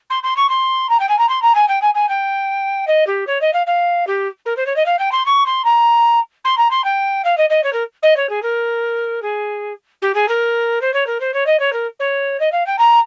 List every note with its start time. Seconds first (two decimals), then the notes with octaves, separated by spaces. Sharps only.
0.10 C6
0.23 C6
0.36 C#6
0.49 C6
0.89 A#5
0.99 G5
1.08 G#5
1.18 A#5
1.28 C6
1.42 A#5
1.54 G#5
1.68 G5
1.81 G#5
1.94 G#5
2.09 G5
2.87 D#5
3.06 G4
3.27 C#5
3.41 D#5
3.53 F5
3.66 F5
4.07 G4
4.45 A#4
4.56 C5
4.66 C#5
4.76 D#5
4.85 F5
4.98 G5
5.11 C6
5.25 C#6
5.45 C6
5.64 A#5
6.44 C6
6.57 A#5
6.70 C6
6.84 G5
7.24 F5
7.37 D#5
7.50 D#5
7.63 C#5
7.72 A#4
8.02 D#5
8.16 C#5
8.29 G#4
8.42 A#4
9.22 G#4
10.02 G4
10.14 G#4
10.28 A#4
10.81 C5
10.93 C#5
11.06 A#4
11.20 C5
11.33 C#5
11.46 D#5
11.59 C#5
11.72 A#4
11.99 C#5
12.40 D#5
12.52 F5
12.66 G5
12.78 A#5